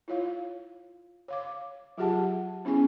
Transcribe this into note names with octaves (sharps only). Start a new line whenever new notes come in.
E4 F4 C#5 F5
C#5 F5 D6
F#3 F4 G4 G#4 F#5 A5
B3 C#4 E4 G#4 G#5